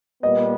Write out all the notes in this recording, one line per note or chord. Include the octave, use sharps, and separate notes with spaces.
A#2 G3 B3 D#5